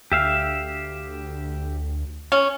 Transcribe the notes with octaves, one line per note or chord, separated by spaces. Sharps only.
D2 G4 E5 F5
C#4